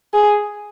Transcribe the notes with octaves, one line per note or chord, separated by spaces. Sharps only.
G#4